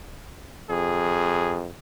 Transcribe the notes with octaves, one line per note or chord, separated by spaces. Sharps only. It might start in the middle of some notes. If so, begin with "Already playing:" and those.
F2 G#4